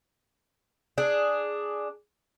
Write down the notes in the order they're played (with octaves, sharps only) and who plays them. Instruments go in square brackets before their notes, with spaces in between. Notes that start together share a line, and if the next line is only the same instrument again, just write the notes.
[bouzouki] D4 G#4